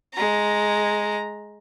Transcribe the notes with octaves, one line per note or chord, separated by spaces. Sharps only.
G#3 A#5